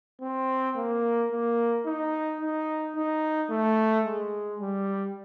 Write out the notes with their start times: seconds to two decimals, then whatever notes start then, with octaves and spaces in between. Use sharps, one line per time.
0.21 C4
0.76 A#3
1.31 A#3
1.86 D#4
2.41 D#4
2.96 D#4
3.50 A3
4.05 G#3
4.60 G3